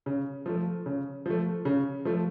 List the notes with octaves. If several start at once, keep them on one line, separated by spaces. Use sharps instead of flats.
C#3
F3 A3
C#3
F3 A3
C#3
F3 A3